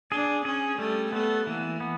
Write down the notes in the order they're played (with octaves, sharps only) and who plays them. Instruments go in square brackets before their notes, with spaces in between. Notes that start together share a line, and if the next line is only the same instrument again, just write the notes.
[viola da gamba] D4 [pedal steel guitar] G#4
[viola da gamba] C#4 [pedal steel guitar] G#4
[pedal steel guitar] G3 [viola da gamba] A3
[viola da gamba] A3 [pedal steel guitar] B3
[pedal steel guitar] E3 [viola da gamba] A#3
[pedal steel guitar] B3